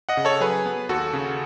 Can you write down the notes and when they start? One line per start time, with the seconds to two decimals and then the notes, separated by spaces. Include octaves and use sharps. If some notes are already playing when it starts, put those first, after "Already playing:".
0.09 D#5 F#5
0.17 C#3
0.25 A4 C#5
0.40 F#3 G#4 B4
0.66 B3
0.89 D#2 F#4 A4
1.13 C#3